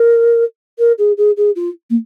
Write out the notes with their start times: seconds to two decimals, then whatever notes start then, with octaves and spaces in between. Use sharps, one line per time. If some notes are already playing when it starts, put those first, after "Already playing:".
Already playing: A#4
0.78 A#4
0.98 G#4
1.17 G#4
1.37 G#4
1.55 F4
1.90 A#3